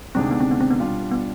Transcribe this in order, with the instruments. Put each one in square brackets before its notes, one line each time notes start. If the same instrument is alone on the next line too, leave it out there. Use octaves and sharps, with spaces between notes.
[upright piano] D2 C3 D#3 G#3 D4 [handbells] C4
[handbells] B3
C4
B3
C4
B3
[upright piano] B2 G3 D4 F4
[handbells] B3